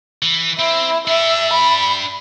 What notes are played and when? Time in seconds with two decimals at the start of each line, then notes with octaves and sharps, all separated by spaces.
0.22 E3
0.59 C4 E4
1.08 D4 G4 E5
1.53 B5